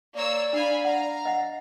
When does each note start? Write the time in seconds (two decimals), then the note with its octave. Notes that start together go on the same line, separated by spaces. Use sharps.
0.15 A#3 C#5 D5 E6
0.53 D4 F5 G#5 B5
0.85 F5 F#5 A#5
1.26 D#5 F#5